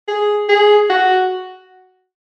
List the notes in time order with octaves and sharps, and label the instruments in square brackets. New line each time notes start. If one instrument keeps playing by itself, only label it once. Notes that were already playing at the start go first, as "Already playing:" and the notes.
[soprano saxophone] G#4
G#4
F#4